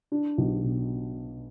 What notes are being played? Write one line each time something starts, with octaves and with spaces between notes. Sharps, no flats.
D4
B1
B2